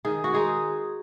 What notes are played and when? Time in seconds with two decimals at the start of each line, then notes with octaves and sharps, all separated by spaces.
0.05 D#3 G#4
0.24 F#4
0.34 G#3 D#4 G#4